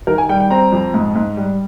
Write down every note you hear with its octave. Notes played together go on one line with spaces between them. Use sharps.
D#3 A#4
G#5
G3 G5
G5
C4 A#5
F2
G#2
G#2
G3